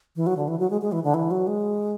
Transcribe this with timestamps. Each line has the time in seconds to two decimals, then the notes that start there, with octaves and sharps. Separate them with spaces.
0.16 E3
0.27 F#3
0.37 D3
0.48 E3
0.59 F#3
0.70 G#3
0.81 G#3
0.92 E3
1.03 D3
1.14 E3
1.31 F#3
1.47 G#3